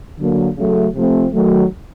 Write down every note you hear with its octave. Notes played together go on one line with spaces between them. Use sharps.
D3 F#3 A#3
C#3 F#3 A3
C3 F3 A3 C4
D#3 F#3 A3